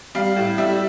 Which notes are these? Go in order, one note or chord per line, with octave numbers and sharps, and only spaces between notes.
G3 F5
A2
G3 E5